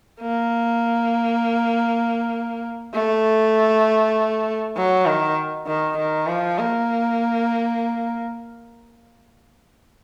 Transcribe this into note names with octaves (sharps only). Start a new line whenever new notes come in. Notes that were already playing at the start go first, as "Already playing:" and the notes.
A#3
A3
F#3
D#3
D#3
D#3
F3
A#3